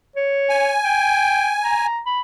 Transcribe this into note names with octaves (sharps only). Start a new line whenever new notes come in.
C#5
G#5
G5
A#5
B5